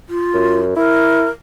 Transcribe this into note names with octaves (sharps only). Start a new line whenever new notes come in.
F4
F#2
E4 A#4